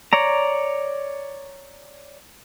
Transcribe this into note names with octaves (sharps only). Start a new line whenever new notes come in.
C#5 D5 A#5